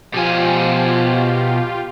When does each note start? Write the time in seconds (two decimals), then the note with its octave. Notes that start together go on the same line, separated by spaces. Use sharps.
0.14 B2 F3 F4 G4 G#5